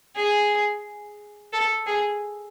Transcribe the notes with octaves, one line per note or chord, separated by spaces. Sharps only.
G#4
A4
G#4